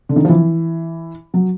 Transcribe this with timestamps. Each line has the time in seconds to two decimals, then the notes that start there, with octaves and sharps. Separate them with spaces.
0.09 D3
0.16 D#3
0.25 F3
0.29 E3
1.34 F#3